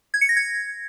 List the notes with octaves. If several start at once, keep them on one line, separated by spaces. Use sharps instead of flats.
G#6
C#7
A#6
G#6